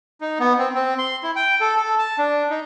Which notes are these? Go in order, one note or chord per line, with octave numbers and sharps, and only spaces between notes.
D#4
B3
C4
C4
C6
E4
G5
A4
A4
A5
D4
D#4